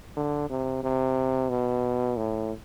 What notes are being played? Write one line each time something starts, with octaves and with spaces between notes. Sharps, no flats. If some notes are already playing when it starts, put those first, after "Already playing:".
D3
C3
C3
B2
A2